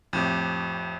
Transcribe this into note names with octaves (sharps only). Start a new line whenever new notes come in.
F2 A2 G4